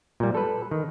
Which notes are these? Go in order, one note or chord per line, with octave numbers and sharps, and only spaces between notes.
A#2 G3
A4 B4
D#3